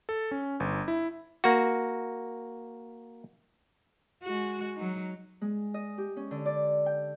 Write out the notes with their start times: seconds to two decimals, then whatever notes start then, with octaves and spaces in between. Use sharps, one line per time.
0.09 A4
0.31 C#4
0.60 G1
0.88 E4
1.44 A#3 F#4
4.23 G#3 F#4
4.76 F#3 D#4
5.41 G#3
5.74 D#5
5.98 G4
6.17 C#4
6.31 D3
6.46 D5
6.86 G5